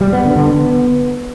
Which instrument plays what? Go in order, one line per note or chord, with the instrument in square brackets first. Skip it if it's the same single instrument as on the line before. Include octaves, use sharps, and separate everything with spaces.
[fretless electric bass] G3
B3
D3
D3
B3